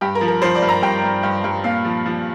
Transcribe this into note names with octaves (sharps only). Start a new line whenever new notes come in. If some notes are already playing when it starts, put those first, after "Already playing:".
G2 G4
A#4
F3
A#4
F3 C5
D5
G2
A#5
G2 G5
G2
G2
G2
A#2 F5
F3
F3